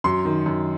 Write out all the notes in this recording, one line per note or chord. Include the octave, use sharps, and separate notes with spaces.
F#2 C6
D#3
F#2